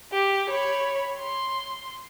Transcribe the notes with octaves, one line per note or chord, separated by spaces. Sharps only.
G4
C#5 B5
C6